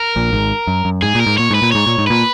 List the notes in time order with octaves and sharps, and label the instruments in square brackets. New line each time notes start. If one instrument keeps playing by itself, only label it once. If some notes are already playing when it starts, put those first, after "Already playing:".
Already playing: [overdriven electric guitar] A#4
[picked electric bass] A#1 A#2
G#1 G#2
F#2
F#2
[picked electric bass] G#2 [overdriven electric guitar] G#4
[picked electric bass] A#2 [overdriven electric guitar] A#4
[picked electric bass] G#2
[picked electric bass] A#2 [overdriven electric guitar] C#5
[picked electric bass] G#2 [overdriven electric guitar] B4
[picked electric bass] A#2
[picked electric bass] G#2 [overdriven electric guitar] C#5
[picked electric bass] A#2
G#2
[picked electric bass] A#2 [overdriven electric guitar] B4